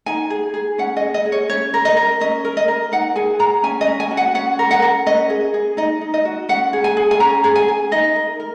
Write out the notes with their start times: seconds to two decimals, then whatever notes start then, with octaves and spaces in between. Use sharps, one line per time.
0.06 D#4 G#5
0.30 G#4
0.54 G#4
0.78 C#4 F#5
0.97 D#5
1.01 G#4
1.14 D#5
1.26 G#4
1.32 C#5
1.50 C#4 C#5
1.74 A#4
1.85 D#5
1.97 A#4
2.20 C#4 D#5
2.45 A#4
2.57 D#5
2.68 A#4
2.92 D#4 F#5
3.15 G#4 G#5
3.39 G#4 A#5
3.63 C#4 G#5
3.81 D#5
3.87 C#4
4.00 G#5
4.11 F#4
4.17 F#5
4.35 C#4 F#5
4.59 A#4
4.71 F#5
4.82 A#4
5.06 C#4 D#5
5.30 G#4
5.54 G#4
5.77 D#4 D#5
6.01 D#4
6.14 D#5
6.25 F#4
6.49 C#4 F#5
6.73 G#4
6.84 G#5
6.97 G#4
7.11 G#5
7.20 C#4 A#5
7.44 G#4
7.56 G#5
7.68 G#4
7.91 D#4 D#5
8.16 A#4
8.40 A#4